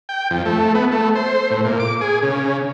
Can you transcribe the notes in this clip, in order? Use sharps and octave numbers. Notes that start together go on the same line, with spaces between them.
G5
F2
A3
B3
A3
C5
A2
A#2
D6
G#4
C#3